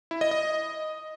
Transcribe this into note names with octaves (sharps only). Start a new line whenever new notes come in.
E4
D#5
D#5